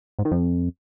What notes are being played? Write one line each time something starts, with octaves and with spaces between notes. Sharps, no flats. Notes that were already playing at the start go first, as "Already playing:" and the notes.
G#2
D#3
F2